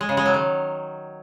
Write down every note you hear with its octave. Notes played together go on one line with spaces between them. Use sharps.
G#3
C#3
G#3
F#3
D#3